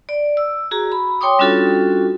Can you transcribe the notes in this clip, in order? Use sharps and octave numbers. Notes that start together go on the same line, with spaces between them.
D5
E6
F#4 G#4 A#5
B5
C#5 G5 C6 D6 D#6
G3 C#4 D4 F4 F#4 A4